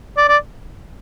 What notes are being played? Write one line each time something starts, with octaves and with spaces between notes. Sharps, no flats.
D5
D5